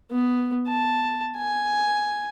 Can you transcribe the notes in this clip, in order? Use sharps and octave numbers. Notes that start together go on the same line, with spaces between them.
B3
A5
G#5